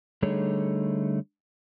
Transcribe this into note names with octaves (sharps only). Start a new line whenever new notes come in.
D3 G3 A3 D#4 G#4 C#5